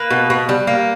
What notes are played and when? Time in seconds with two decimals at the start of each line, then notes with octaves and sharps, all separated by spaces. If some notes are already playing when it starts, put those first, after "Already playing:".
Already playing: A#3 B4
0.10 B2
0.30 B2
0.49 G3
0.67 A#3